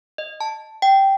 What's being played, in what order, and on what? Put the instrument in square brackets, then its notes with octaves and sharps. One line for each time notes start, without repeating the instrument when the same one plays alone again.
[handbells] D#5
A5
G5